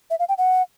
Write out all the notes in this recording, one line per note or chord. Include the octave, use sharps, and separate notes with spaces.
E5
F5
G5
F#5